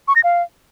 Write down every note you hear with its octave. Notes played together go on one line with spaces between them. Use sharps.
C#6
A#6
F5